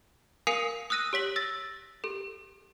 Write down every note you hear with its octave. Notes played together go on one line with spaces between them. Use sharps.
A#4 F5 G#5 D#6 C7 D#7
D#6 E6 F#6 A#6 D#7
G4 C#5 B6 F#7
E6 A6 A#6
G4 A4